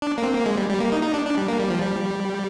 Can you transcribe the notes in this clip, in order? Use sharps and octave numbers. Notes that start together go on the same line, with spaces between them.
D4
A#3
C4
A#3
G#3
G3
G3
A#3
D#4
D#4
D4
D4
G3
A#3
G3
F3
G3